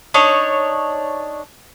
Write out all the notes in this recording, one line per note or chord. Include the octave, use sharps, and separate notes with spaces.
D4 D#4 C#5